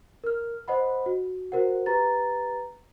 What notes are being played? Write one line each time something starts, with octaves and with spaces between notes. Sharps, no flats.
A#4 F6
C5 D#5 F#5 B5
F#4
F#4 A#4 C5 F#5
G4 B4 A#5 A6